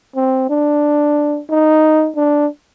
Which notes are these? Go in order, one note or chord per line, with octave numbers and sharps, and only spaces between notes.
C4
D4
D#4
D4